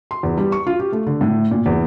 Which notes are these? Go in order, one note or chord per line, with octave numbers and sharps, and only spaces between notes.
C6
E2
G3
C#6
F4
G4
A3
D3
A2
A#2
E2